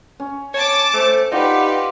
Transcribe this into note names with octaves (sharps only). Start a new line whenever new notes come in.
C#4
C#5 A5 D6
A3 C5
D#4 F4 G4 B4 D5 F#5